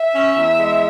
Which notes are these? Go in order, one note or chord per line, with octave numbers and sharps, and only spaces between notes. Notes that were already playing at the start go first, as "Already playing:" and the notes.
Already playing: E5
C#4
E2
G#3